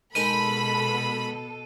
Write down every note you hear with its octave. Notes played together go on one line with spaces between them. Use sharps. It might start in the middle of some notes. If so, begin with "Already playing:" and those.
B2 G#3 D#4 A4 A#4 B5 D#7